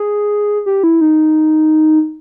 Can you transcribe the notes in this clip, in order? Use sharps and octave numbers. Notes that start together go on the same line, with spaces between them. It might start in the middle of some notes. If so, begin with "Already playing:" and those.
Already playing: G#4
G4
E4
D#4